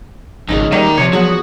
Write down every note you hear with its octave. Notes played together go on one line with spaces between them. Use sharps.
G#1 F2 C#3 G#3 C#4 D#4
D#3 G3 A#3 D#4 D5 E5 A#5
C3 F3 C#5
F#3 B3 F#4 G#4